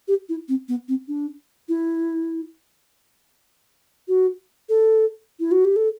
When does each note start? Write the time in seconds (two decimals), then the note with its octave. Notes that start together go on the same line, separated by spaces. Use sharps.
0.08 G4
0.29 E4
0.49 C4
0.69 B3
0.88 C4
1.08 D4
1.69 E4
4.08 F#4
4.69 A4
5.40 E4
5.52 F#4
5.65 G4
5.76 A4